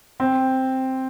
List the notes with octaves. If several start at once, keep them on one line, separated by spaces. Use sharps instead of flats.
C4